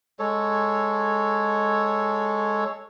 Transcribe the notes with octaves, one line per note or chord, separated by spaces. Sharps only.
G#3 A4 C#5